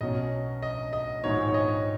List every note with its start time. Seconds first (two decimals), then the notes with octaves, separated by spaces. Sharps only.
0.01 B1 B2 F#3 C#4 D#5
0.62 D#5
0.93 D#5
1.24 A#1 G#2 D#3 F#3 C#5
1.48 C#5
1.54 D#5